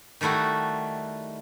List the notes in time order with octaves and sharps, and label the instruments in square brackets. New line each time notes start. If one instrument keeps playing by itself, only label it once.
[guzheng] D#3 G3 A3 E4 F#4